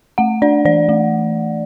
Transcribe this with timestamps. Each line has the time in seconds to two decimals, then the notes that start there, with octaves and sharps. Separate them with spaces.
0.18 A3 F#5
0.42 D4 D5
0.65 E3 D5
0.89 A3